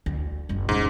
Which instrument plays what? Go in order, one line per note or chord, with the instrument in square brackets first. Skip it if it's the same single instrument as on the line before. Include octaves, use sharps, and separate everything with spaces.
[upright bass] D2
F#1 C#2
[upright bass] D#1 C#3 [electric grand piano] G#2